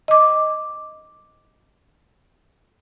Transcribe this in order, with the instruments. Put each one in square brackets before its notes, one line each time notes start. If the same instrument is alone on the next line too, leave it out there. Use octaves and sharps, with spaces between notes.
[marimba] D#5 D6